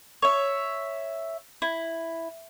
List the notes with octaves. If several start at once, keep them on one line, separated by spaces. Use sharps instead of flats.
C#5 E5
E4